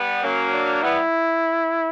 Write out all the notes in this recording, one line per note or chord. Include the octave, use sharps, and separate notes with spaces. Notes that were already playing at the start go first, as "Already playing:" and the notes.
Already playing: G3 B3
F#3 A#3 C#4
D4
G3 B3 E4